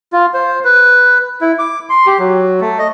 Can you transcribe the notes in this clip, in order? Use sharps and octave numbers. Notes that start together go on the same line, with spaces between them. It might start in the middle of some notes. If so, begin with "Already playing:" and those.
F4
C5
B4
E4
D6
C6
G4
F#3
A3
D#5